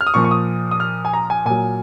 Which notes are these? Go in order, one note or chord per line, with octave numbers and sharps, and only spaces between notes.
F6
D#6
A#2 F3 C#6
C#6
D#6
D#6
F6
G#5
A#5
G#5
A#2 F#3 G#5